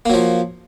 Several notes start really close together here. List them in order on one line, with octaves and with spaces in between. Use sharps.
A#3 F#3 F3